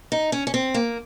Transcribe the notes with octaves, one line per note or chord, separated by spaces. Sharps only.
D#4
C#4
C#4
C4
A#3